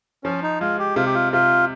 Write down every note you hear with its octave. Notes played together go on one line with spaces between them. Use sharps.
F3 C#4
D#4
G#3 F4
G4
C3 F4
G4
F4
C3 F4